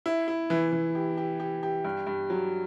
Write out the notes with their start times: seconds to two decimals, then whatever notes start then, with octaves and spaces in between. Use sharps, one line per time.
0.06 E4
0.28 E4
0.50 E3
0.72 E3
0.95 G4
1.17 G4
1.40 G4
1.63 G4
1.84 G2
2.07 G2
2.30 F#3